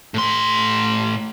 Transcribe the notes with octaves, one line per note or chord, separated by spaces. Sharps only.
A2 C6